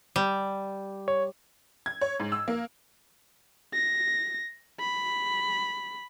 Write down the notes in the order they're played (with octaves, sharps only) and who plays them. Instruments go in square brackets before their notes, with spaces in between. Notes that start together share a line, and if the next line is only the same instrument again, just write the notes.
[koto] G3
[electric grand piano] C#5
[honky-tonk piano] G#6
C#5
G#2
E6
A#3
[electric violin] A#6
B5